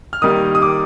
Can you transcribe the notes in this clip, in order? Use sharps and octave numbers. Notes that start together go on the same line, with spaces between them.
F6
D#3 G3 A#3 D#4 D#6
D#6
D6